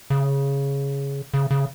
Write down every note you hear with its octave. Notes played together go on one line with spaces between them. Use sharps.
C#3
C#3
C#3